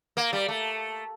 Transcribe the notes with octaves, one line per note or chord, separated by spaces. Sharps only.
A#3
G3
A3